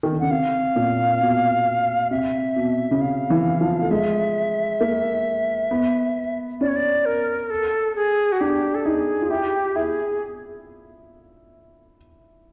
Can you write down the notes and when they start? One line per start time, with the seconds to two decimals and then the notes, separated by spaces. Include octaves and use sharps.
0.03 D#3
0.13 D3
0.20 C#3 F#5
0.31 C3 F5
0.76 A#2
1.21 B2
2.11 C3 E5
2.56 B2
2.91 C#3
3.01 C3 F5
3.30 E3
3.61 F3
3.81 A3
3.91 G#3 E5
4.81 A#3
5.71 B3
6.61 C#4 D5
6.68 C#5
6.76 D5
7.06 A#4
7.50 A4
7.96 G#4
8.32 F#4
8.41 D4 G4
8.75 A4
8.85 D#4 G#4
9.22 F4
9.30 E4 G4
9.76 E4 G#4